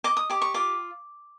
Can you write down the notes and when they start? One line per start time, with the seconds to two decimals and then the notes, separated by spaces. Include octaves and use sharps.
0.04 D#5 D6
0.17 D#6
0.30 G4 D6
0.42 C#6
0.54 F4 D6